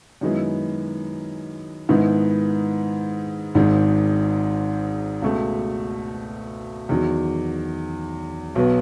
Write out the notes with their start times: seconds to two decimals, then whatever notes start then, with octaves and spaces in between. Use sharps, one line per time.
0.21 F#2 D#3 G#3 B3 E4
1.89 G#2 D#3 G#3 B3 E4
3.55 G#1 G#2 D#3
5.22 C#2 B2 A3
6.89 E2 D#3 F#3
8.55 B1 B2 F#3 B3